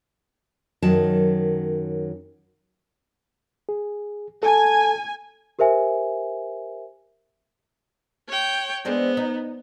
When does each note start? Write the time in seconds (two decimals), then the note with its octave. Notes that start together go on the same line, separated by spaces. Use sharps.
0.82 F#2 D#3 F#3 A5
3.69 G#4
4.43 A4 G#5 A5
5.59 G4 A#4 C5 E5 G#5
8.29 C#5 G5
8.85 G#3 B3 C4 D4
9.17 D#4